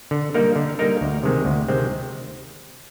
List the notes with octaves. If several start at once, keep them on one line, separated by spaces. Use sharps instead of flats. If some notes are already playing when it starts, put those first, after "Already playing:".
D3
G3 A#3 D#4 A#4
D3
G3 A#3 D#4 A#4
D2
C3 D#3 G#3 C4
D2
C3 D#3 G#3 C4